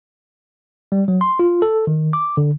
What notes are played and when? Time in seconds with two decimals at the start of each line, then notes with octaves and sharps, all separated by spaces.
0.92 G3
1.08 F#3
1.21 C6
1.39 F4
1.62 A4
1.87 D#3
2.13 D6
2.37 D3